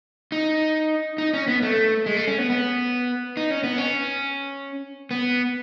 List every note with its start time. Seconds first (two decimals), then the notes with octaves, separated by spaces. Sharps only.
0.32 D#4
1.18 D#4
1.33 C#4
1.48 B3
1.62 A3
2.06 G#3
2.17 A3
2.27 C#4
2.38 B3
2.50 B3
3.37 D#4
3.51 C#4
3.63 B3
3.78 C#4
5.11 B3